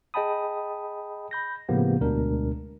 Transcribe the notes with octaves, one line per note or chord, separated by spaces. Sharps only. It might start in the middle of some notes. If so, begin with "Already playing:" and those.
G#4 D#5 G5 A5 B5 D#6
B5 G6 A#6
A2 C#3 F3 A#3 B3 G4
D2 B2 G#3 D4 A#4